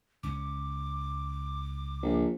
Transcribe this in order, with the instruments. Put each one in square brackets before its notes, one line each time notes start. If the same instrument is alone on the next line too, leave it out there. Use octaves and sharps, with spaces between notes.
[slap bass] C#2 C#4 [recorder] D6
[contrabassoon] A#1